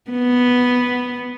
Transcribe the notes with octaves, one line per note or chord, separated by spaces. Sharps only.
B3